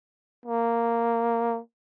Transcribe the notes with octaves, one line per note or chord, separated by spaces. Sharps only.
A#3